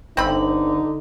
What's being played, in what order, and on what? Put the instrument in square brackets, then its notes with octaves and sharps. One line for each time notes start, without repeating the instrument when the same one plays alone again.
[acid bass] G1 [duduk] D3 [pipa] C4 B5 [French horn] D#4